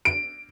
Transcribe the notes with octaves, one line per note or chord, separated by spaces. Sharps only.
D7